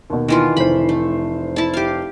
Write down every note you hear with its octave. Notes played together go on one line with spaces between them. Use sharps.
D#2 B2
D#3 E3 F4
F1 C5 B5
A3
E4 A5
G4 F5